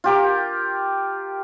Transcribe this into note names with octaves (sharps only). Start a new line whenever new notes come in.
F4 G4 A#4